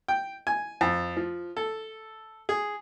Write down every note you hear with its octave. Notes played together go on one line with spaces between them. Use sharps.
G5
G#5
F2
F3
A4
G#4